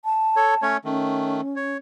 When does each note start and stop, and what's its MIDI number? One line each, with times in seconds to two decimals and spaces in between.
0.05 0.62 81
0.36 0.55 69
0.36 0.55 73
0.62 0.77 57
0.62 0.77 61
0.62 0.77 73
0.85 1.41 51
0.85 1.41 57
0.85 1.77 61
1.56 1.77 73